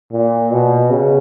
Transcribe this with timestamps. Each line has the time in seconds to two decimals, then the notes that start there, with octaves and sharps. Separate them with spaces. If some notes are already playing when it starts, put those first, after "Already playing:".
0.12 A#2
0.51 B2
0.90 C#3